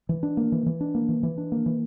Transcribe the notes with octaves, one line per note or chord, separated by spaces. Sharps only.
E3
D4
A#3
E3
E3
D4
A#3
E3
E3
D4
A#3
E3